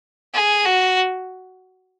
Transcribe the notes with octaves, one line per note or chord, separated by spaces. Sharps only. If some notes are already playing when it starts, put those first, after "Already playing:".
G#4
F#4